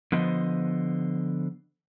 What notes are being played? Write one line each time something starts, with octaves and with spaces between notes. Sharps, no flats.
D3 F3 B3 C5 D#5